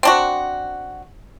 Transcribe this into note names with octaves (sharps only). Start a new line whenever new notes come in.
C4 D4 F#4